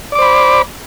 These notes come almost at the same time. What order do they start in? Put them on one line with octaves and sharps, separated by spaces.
D5 D6 C5 B5